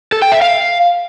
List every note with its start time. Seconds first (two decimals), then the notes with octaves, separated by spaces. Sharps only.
0.12 A4
0.22 G5
0.32 E5
0.42 F5